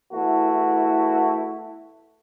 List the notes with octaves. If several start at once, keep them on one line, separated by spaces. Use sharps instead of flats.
E2 A3 E4 F#4 A4